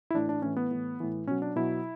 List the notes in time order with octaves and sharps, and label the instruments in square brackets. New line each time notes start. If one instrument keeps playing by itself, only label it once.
[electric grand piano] E4
A2 E3 D4
D4
A2 E3 C#4
B3
A2 E3
A2 E3
B2 F#3 C#4
D4
B2 F#3 E4